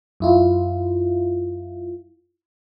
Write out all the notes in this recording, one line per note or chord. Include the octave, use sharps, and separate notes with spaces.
F#2 E4 F4